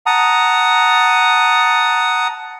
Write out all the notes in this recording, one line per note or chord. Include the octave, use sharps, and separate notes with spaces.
F#5 A5 A#5 D#6